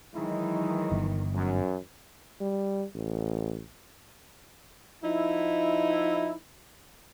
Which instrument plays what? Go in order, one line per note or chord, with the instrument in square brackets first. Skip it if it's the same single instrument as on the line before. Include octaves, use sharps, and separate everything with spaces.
[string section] D#3 E3 F#3 [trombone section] G#3 D#4 E4
[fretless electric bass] G1
[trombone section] F#2
[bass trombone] G3
A1
[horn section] F3 D#4 E4